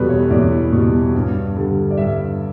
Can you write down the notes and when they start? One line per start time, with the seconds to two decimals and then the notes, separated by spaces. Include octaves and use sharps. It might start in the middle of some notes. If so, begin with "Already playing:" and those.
Already playing: E2 B2 G3 A4 B4
0.09 C#5
0.31 E2 D5
0.72 B2 G3
1.15 G2
1.56 D3 G3
1.91 D5
1.97 G2 E5